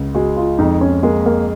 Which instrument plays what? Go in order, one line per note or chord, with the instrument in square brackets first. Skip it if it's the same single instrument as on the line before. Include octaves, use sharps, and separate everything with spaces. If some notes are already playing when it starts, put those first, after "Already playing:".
Already playing: [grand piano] C#2
[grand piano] G#3 [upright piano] F#4
[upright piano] F4
[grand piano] F2 [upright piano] D#4
[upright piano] C#4
[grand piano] G#3 [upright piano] A#3
[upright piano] A#3